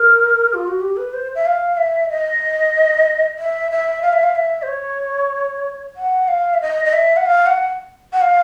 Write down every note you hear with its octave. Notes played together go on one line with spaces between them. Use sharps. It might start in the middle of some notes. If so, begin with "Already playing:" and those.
Already playing: A#4
F4
F#4
G4
B4
C5
E5
F5
E5
D#5
E5
E5
F5
E5
F5
E5
C5
C#5
F#5
F5
E5
D#5
D#5
E5
F#5
F5
F#5
F#5
F5